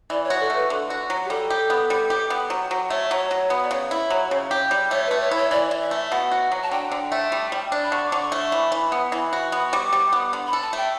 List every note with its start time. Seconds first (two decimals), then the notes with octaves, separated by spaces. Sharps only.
0.10 E3 D5
0.25 C#5
0.30 F#4
0.40 A4
0.50 A3
0.55 B4
0.70 D3
0.90 F#4
1.10 F#3
1.25 G4
1.30 G3 A4
1.50 G4
1.70 B3
1.90 G3
2.10 G4
2.30 B3
2.50 F#3
2.71 F#3
2.90 A3 C#5
3.11 F#3 C#5
3.31 F#3
3.50 B3
3.63 D5
3.71 C#3 C#5
3.91 E4
4.10 F#3
4.31 C#3
4.51 G4
4.71 G3
4.91 A3 C#5
5.07 A3 B4
5.21 C#5
5.31 E4
5.37 C#5
5.51 E3 D5
5.71 E3
5.82 E5
5.91 A3
5.97 E5
6.11 B2 F#5
6.31 F#4
6.52 F#3
6.63 A5
6.71 D3 G5
6.92 D3
7.12 A3
7.32 G3
7.52 G3
7.72 D4
7.84 B5
7.92 D3 C#6
8.07 D6
8.12 D3
8.22 C#6
8.32 A3
8.37 C#6
8.52 E3 B5
8.72 E3
8.92 B3
9.12 E3 B5
9.33 F#4
9.52 B3
9.72 G3 D6
9.93 G3
10.13 B3
10.33 D3
10.47 B5
10.53 A4
10.62 A5
10.73 A3 G5